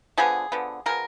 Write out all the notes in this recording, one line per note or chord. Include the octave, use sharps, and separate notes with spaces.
D3 F3 B3 G#4
D3 F3 B3
F3 G#3 B3 A#4